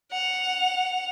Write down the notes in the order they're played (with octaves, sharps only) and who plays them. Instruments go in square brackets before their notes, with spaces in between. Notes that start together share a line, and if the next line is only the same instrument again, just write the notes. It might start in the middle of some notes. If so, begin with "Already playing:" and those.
[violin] F#5 F7